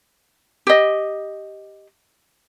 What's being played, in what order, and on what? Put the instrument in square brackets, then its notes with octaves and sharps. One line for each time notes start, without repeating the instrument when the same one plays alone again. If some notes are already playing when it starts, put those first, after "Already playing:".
[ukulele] G4 D#5